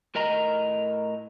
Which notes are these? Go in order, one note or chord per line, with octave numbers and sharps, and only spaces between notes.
A2 A#4 D#5 A#5